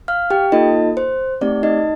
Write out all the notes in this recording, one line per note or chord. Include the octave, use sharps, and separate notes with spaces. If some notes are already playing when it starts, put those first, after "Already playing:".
F5 F6
G4 G5
A#3 D#4 F4 A4 D#5
C5
A3 C4 D#4 G4 D5
D#4 D#5